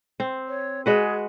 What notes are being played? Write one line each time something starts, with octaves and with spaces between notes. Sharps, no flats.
C4
C#5
G#3 F#4 G#4 B4